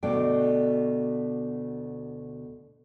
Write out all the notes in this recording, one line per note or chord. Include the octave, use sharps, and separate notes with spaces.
D2 B2 A3 D4 D5 G5